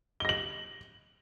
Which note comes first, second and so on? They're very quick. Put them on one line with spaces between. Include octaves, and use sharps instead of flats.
G7 A#6 F#7